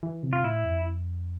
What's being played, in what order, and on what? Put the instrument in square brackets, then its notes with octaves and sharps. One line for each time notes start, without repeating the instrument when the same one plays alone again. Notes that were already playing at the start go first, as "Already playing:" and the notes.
[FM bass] E3
C3
[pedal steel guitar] F4
[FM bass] A2 [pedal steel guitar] E4
[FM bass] F2